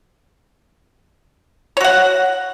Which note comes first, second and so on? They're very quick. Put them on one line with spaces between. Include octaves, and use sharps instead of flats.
C#5 F#4 F#5